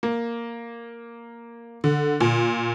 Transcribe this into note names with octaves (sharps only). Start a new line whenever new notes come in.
A#3
D3
A#2